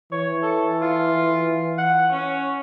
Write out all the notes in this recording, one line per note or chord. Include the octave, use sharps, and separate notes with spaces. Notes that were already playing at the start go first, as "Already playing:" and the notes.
E3 C#5
A4
F4
F#5
C#4